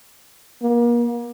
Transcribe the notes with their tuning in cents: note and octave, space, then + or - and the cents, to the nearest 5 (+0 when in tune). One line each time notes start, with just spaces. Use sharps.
A#3 +35